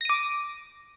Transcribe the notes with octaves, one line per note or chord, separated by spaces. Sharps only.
D6 A#6 D#7